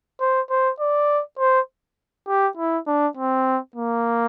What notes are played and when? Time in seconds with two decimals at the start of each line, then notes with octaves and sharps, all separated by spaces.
0.20 C5
0.50 C5
0.80 D5
1.39 C5
2.28 G4
2.57 E4
2.87 D4
3.17 C4
3.76 A#3